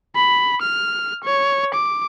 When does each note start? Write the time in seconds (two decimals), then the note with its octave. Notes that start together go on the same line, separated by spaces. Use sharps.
0.15 B5
0.62 F6
1.24 C#5
1.74 D6